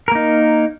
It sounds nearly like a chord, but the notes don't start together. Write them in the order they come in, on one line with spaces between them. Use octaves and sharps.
A#4 A#3 D#4